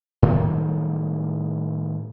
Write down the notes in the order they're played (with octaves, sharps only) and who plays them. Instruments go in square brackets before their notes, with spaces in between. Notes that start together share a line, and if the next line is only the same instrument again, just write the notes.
[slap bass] A2 D#3 F#3 G3